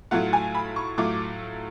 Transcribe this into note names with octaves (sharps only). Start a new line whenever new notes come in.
A2 F#3 A3 F4 F#5
G#5
B5
C#6
A2 F#3 A3 F4 D6